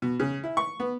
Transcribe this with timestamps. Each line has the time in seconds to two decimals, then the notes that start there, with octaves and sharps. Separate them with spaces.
0.02 B2
0.20 C#3
0.44 E4
0.57 C#6
0.80 B3